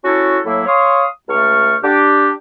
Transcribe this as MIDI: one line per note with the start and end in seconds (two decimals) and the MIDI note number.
0.05 0.40 61
0.05 0.40 64
0.05 0.40 66
0.05 0.40 69
0.46 0.64 45
0.46 0.64 54
0.46 0.64 58
0.46 0.64 64
0.67 1.04 73
0.67 1.04 77
0.67 1.04 84
0.67 1.04 85
0.67 1.04 87
1.29 1.75 37
1.29 1.75 57
1.29 1.75 85
1.29 1.75 89
1.83 2.30 62
1.83 2.30 67